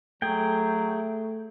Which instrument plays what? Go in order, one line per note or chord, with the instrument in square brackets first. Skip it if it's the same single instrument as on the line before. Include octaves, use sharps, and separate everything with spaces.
[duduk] F#3 [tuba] A3 [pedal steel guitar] G#4 G5